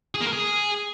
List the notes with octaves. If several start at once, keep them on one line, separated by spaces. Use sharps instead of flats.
G#4
A#3
A#4
G#4